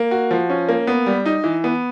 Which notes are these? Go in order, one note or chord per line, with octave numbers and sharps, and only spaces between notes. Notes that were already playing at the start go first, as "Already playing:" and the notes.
Already playing: A#3
F#4
F3
C#4
A#3
B3
G3
D#4
E3
B3